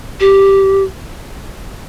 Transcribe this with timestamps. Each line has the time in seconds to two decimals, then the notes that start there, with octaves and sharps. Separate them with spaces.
0.20 G4